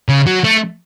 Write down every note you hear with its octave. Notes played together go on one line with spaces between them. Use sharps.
C#3
F#3
A3